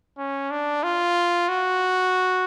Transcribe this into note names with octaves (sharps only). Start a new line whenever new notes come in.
C#4
D4
F4
F#4